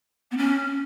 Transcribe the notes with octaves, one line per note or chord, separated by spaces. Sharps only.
B3
C#4